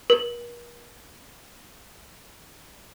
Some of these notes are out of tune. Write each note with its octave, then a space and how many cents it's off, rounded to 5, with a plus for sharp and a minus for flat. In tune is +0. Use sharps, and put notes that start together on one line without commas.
A#4 +45